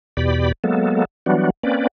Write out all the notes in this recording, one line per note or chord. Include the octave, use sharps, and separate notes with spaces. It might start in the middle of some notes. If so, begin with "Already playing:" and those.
E2 B2 G4 D5 B5
F#3 G#3 A#3 B3 A4
E3 F#3 G3 B3 D4 F#4
A#3 C4 C#4 B4 D5